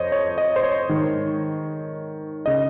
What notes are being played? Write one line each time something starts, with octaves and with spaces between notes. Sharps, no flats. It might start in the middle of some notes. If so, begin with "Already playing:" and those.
Already playing: F2 C5 C#5 D#5
C#5
D#5
C5
C#5
G#2 D#3
C#3 D#5